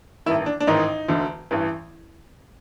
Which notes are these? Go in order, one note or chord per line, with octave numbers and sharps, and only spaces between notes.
A1 G2 D#3 E4
D4
D4
A1 G#2 D#3 D#4
E1 D2 D3
A1 G2 E3